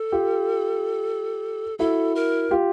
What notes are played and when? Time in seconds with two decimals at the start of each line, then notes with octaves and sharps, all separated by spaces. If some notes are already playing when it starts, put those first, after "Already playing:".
Already playing: A4
0.12 F4 G4
1.79 E4 F#4 A4
2.15 A#4
2.51 F4 G4